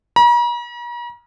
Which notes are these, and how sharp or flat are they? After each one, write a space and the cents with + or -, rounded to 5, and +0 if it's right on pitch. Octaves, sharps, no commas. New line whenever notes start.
A#5 +45